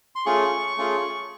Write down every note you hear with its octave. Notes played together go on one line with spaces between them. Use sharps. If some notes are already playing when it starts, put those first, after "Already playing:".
C6
A3 C#4 F4 G#4 C#6
A3 C#4 F4 G#4